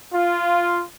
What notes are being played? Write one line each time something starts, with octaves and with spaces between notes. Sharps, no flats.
F4